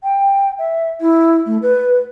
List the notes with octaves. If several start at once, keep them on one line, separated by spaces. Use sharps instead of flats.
G5
E5
E4
A3
B4